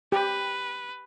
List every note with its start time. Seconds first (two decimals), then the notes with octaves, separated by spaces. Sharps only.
0.12 G4 B4